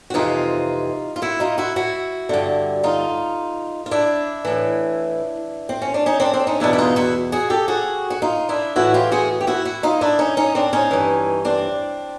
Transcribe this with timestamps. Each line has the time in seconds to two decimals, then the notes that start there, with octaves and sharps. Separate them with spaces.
0.10 F#4
0.14 F2 C3 E3 D#4 F4
1.16 F4
1.22 E4 F#4
1.40 D#4 F4
1.58 E4 F#4
1.76 E4 F#4
2.29 G2 D3
2.83 D#4 F4
3.86 F4
3.91 D4 E4
4.45 A2 E3
5.69 C4
5.82 C#4
5.94 D4
6.06 C#4 D#4
6.20 C4 D4
6.33 C4 D4
6.47 C#4 D#4
6.60 E2 B2 D4 E4
6.73 E4
6.78 D#4 F4
6.96 E4 F#4
7.32 F#4 G#4
7.50 G4 A4
7.68 F#4 G#4
8.10 F#4
8.22 D#4 F4
8.49 D4 E4
8.76 A2 E3 E4 F#4
8.94 F4 G4
9.12 F#4 G#4
9.41 G4
9.47 E4 F#4
9.65 E4 F#4
9.83 D#4 F4
10.01 D4 E4
10.19 C#4 D#4
10.37 C#4 D#4
10.55 C4 D4
10.73 C#4 D#4
10.91 G2 E3
11.45 C4 D4